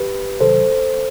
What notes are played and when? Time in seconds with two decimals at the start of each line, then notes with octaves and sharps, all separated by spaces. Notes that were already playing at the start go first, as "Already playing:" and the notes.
Already playing: G4 B4
0.41 C3 D#3 F#3 A4 C5